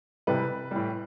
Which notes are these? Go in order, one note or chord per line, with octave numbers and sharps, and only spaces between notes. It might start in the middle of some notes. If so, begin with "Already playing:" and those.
C3 E3 G3 B4
A2 E3 G3